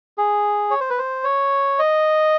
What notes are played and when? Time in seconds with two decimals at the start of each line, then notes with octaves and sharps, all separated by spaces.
0.18 G#4
0.70 C#5
0.80 C5
0.90 B4
0.99 C5
1.24 C#5
1.79 D#5